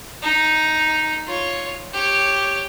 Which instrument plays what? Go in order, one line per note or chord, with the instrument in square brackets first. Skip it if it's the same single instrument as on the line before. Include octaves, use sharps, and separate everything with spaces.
[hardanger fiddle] D#4
F4 C#5
G4 C#5